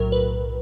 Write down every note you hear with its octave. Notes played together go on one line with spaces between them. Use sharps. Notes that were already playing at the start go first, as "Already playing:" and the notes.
Already playing: B1 A2 F#3 A#4
B4